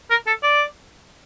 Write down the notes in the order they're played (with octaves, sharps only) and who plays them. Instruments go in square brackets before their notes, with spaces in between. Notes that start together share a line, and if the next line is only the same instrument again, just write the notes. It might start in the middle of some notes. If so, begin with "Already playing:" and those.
[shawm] A#4
A4
D5